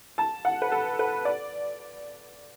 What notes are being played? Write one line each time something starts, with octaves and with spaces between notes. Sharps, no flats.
A5
F#5
B4
A4
B4
D5